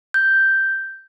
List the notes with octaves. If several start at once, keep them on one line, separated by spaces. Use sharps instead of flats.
G6